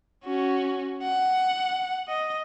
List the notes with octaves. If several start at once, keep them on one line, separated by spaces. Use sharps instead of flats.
C#4 F#4
F#5
D#5